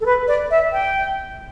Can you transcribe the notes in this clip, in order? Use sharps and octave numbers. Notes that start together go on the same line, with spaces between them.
A4
B4
D5
E5
G5